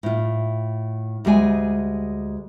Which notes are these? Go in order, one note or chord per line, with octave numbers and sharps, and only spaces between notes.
A2 F4
D2 G3 G#3 G#5